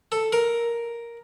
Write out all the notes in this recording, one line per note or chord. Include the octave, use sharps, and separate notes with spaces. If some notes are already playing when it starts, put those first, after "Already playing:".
A4
A#4